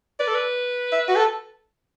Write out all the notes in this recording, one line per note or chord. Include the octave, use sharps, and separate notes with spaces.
B4 D5
A4
B4
E5
F#4
A4